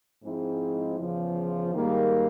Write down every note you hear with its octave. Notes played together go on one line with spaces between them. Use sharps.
G#2 F3 G#3 C4 E4
E2 C#3 F3
G#2 D#3 G3 A#3